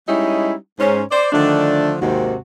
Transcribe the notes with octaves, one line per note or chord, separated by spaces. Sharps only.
G3 G#3 C#4 D#4 E4
G#2 C#4 C5
C5 D5
D3 D#3 F3 A3 D4
D#2 G#2 C3 D#3 C4 F#4